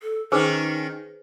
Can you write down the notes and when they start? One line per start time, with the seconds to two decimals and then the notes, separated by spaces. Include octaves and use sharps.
0.02 A4
0.32 D#3 C#4 D#4 G#4 B4 C5